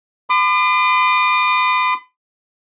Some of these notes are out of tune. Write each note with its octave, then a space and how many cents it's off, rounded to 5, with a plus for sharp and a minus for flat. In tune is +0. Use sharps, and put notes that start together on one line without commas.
B5 +45 D6 +45